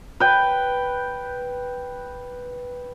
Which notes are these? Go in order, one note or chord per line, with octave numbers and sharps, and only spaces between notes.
B4 G5